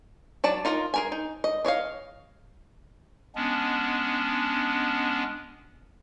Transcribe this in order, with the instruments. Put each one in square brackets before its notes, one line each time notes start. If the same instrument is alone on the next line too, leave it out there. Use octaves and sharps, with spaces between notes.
[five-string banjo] F#3 D5 A5
D#4 F4 A#4 A#5
G#4 A#4 G#5
D#4
D#5
D4 C#5 D#5 F5
[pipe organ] G#3 B3 C#4 D4